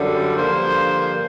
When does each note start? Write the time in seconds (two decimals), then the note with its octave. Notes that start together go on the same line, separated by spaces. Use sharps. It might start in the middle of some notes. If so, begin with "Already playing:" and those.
Already playing: F#2 D3 G3
0.36 G2 D3 F3 A#3 C5